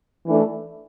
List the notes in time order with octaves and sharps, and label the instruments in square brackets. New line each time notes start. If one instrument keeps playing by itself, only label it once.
[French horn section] E3 A3 D4